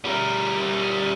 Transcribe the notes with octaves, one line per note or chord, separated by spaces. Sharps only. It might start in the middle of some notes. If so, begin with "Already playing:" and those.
G3 A#4